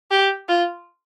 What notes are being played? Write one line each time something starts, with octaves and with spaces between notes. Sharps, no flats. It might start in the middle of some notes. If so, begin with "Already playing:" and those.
G4
F4